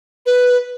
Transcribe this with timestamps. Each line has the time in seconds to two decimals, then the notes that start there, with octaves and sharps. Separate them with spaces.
0.26 B4